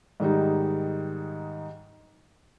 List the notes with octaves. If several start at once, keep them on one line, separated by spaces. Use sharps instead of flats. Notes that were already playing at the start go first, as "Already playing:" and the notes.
G#2 D#3 G3 D#4